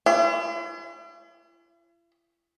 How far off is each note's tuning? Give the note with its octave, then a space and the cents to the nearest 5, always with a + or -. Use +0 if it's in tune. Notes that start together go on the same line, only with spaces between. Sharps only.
E4 +45